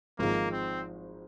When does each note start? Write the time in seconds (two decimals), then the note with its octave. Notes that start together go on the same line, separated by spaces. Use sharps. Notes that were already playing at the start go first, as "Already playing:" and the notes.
0.19 G#1 G#2 F3 G#3 A#3 D#4
0.52 C4